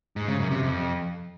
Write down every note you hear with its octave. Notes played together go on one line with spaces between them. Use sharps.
G#2
C#3
F#2
C3
F2